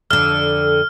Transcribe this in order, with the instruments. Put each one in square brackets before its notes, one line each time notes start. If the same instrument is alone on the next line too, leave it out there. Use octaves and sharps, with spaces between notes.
[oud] F2 D3 [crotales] F6